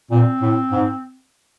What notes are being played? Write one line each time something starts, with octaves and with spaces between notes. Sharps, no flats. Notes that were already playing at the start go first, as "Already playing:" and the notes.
A#2 C4
A2
G#2